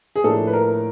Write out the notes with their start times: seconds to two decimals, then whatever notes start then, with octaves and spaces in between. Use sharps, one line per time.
0.16 G#4
0.24 A2 F3 A#3 D4 A4
0.47 B4
0.53 A#4